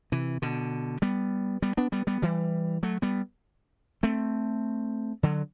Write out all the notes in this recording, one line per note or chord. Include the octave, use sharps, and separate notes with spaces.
C3 E3
B2 D3
G3 B3
G3 B3
B3 D4
G3 B3
G3 B3
E3 G3
F#3 A3
G3 B3
A3 C4
D3 F#3